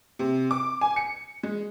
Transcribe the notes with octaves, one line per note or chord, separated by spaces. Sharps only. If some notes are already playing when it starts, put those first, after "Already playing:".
C3
D6
G#5
C#7
G#3